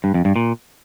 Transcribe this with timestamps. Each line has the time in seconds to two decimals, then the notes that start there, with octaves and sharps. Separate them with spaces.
0.04 G2
0.14 F2
0.25 G2
0.36 A#2